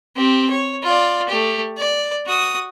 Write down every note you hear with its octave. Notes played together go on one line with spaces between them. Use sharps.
C4 G4
C#5
F4 D5
A3 G4
D5
F#4 D#6